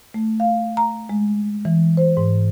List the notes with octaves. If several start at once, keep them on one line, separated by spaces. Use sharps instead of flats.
A3
F5
A#5
G#3
E3
C5
G#2